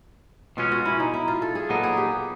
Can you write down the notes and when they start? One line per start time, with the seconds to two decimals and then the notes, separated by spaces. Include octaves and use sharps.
0.57 B2 G#3 C#4 F4
0.72 F#4
0.85 E4
1.00 D#4
1.13 E4
1.28 F4
1.42 A4
1.55 G#4
1.69 A#2 F#3 B3 D#4 A4
1.83 G#4
1.97 G4